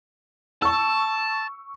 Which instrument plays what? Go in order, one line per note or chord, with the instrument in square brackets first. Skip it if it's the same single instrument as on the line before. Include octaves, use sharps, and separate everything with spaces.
[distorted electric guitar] A5 [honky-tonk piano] C#6 E6